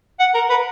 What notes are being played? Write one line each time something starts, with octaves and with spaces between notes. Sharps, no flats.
F#5
A#4
B4